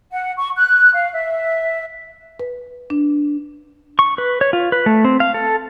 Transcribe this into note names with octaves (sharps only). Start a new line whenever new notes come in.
F#5
C#6
F#6
F5
E5
B4
D4
C#6
B4
C#5
F4
B4
A3
C4
F5
A4